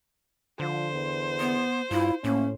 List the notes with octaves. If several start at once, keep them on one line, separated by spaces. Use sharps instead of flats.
D3 F3 C5
E2
B3
G2 E4 F4
A2 A#3 C#4